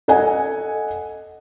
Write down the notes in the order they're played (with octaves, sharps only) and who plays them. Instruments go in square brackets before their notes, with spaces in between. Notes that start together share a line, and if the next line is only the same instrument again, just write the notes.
[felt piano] A4 D#5 F#5 G#5